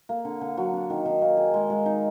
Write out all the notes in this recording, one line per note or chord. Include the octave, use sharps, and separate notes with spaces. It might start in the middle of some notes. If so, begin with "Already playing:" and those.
A#3
D3
D3
F#3
D4
D#3
D#3
A#3
G#4
G#3
G#3
D#4